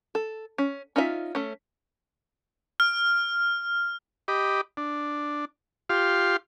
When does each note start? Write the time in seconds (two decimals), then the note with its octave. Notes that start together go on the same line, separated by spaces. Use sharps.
0.15 A4
0.58 C#4
0.96 C#4 D#4 F4 D#5 E5
1.35 A3 C#4
2.80 F6
4.28 G4 D#5 B5 D6
4.77 D4
5.89 F4 G4 F5 C6